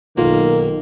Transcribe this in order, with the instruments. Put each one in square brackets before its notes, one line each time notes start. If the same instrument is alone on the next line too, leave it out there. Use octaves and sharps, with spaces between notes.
[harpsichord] B1 [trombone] D#3 [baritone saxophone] A#3 [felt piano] F4